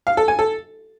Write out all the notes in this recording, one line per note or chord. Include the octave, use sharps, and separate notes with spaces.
F5
A4
G#5
A4